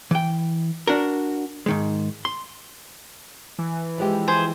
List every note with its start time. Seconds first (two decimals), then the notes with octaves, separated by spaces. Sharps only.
0.11 E3 G5
0.87 D4 F#4 A#4
1.66 G#2 D#3 G#3
2.25 C6
3.59 E3
3.98 F3 G#3 G4
4.28 G#4 C5